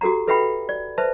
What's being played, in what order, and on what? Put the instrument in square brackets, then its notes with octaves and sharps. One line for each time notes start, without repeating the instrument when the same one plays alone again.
[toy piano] F#4 G4 A4 F#5 A#5
A4 B4 E5 F#5 G5 B5
D5
B4 C5 E5 A5